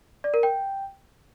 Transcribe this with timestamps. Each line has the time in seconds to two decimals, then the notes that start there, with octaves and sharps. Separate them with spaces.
0.24 D5
0.34 A#4
0.43 G5